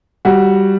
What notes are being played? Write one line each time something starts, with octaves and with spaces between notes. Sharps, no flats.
G3 F#4